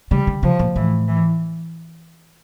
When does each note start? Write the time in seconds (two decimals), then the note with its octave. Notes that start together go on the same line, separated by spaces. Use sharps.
0.11 C#3 G3
0.27 D3
0.43 C#3 F3
0.59 A#2
0.76 A2 E3
1.08 E3